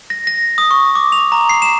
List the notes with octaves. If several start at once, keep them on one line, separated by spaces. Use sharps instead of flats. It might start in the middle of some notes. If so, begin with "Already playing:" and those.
A#6
A#6
D#6
C#6
D6
F7
A#5
C7
E7